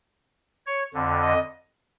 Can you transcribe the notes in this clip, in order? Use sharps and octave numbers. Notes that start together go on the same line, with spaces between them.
C#5
F2 D3
D#5